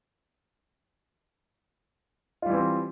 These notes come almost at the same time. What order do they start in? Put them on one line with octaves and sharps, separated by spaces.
F4 G3 E3 C4